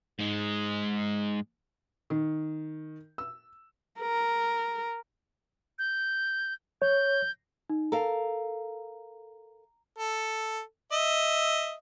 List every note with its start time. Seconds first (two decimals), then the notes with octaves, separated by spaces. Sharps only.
0.19 G#2 G#3
2.10 D#3
3.18 E6
4.00 A#4
5.79 G6
6.82 C#5 G6
7.70 D#4
7.92 A4 A#4 F5 A#5
9.98 A4
10.92 D#5 E5